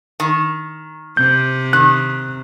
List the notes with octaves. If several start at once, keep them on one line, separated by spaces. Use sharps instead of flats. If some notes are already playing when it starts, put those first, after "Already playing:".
D#3
C3 G6
D#3 F#6